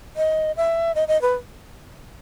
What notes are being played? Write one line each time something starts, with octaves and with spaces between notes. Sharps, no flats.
D#5
E5
D#5
D#5
B4